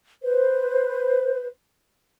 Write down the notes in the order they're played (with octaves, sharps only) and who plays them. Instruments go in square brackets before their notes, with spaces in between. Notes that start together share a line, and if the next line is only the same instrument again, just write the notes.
[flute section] B4 C5